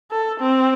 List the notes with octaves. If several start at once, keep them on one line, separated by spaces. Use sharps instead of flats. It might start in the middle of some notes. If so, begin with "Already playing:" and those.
A4
C4